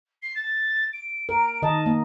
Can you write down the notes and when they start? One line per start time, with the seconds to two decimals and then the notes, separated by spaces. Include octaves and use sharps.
0.22 C7
0.35 A6
0.93 D7
1.29 A#4 D7
1.62 D#3 D#5 A5
1.86 A#3